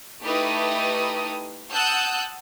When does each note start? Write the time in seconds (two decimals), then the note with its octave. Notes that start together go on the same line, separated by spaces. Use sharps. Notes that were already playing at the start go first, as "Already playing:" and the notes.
0.22 A3 D#4 E4 G4 B4 D#6
1.74 F#5 A5 D#6 E6 F#6 G6